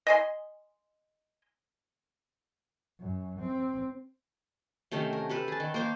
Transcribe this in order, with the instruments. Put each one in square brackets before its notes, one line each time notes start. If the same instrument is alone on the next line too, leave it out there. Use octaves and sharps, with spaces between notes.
[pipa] D#5 G#5 C6
[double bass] F#2
C4
[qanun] C3 D#3 A3 C#4
A#4
G4 A4 B4 E5
G#4 A5
D#3
A#3 C5 F5